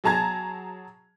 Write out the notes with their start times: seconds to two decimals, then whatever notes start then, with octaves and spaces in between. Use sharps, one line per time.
0.04 F#3 G#4 A5 A#5 G#6